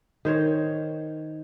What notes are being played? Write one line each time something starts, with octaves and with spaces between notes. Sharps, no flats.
D#3 C5 C#5